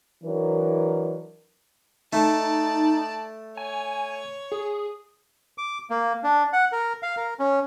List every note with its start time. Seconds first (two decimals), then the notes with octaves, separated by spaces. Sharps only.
0.24 E3 F#3 D4 A#4
2.13 A3 D#4 D5 A5
3.57 C#5 G#5
4.52 G#4
5.58 D6
5.90 A#3
6.23 D4
6.53 F#5
6.72 A#4
7.03 F5
7.17 A#4
7.39 C#4